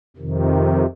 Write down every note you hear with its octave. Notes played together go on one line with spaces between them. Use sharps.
F2 C3 D#3